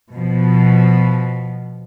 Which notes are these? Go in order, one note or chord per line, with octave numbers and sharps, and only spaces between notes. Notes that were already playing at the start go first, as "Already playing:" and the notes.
B2 F3